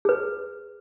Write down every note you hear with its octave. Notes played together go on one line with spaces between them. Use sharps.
G#4 B4